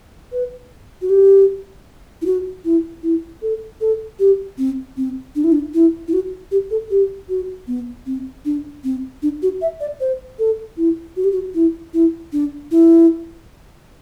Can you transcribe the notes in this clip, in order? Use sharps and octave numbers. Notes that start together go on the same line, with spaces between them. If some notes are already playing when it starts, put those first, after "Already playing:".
B4
F#4
G4
E4
F#4
E4
E4
A4
A4
G4
C4
C4
D4
E4
D4
E4
E4
F#4
G4
A4
G4
F#4
B3
C4
D4
C4
D4
F#4
E5
D5
C5
A4
E4
F#4
G4
F#4
E4
E4
D4
E4